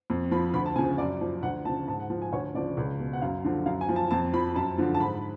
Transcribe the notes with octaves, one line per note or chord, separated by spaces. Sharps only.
F2
F3 B5
D2 B5
A5
C#3 F3 G#5
F#2 D5
F3
D2 F#5
C#3 F3 A5
G#2 A5
F#5
F3
G#5
D2 C#5
C#3 F3 D5
C#2
B2
F#5
F#2 F5
D3 F3
F#2 F5
G#5
F3
A5
F2 A5
F3 B5
F#2 A5
D3 F3
A5
G#2 B5